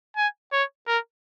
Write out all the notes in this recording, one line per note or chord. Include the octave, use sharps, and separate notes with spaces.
G#5
C#5
A#4